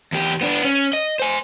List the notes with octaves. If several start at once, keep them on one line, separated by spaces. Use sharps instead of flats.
E2 G4
B3 D4
C#4
D#5
C5 G#5